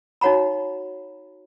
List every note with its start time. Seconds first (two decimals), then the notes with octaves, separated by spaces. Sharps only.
0.21 D#4 F#4 C#5 F#5 A#5 B5